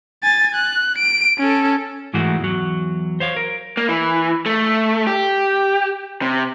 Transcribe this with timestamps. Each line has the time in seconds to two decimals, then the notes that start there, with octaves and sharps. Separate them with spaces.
0.24 G#5 A6
0.55 F#6
0.99 D7
1.38 C#4 A4
2.14 G#2 E3 G#3 A3 F#4
2.40 E2 F#3
3.20 C5 C#5 F5
3.36 A#4
3.77 A#3
3.89 E3
4.46 A3
5.07 G4
6.22 C3